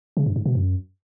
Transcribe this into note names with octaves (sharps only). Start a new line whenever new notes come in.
C#3
G2
G#2
B2
F#2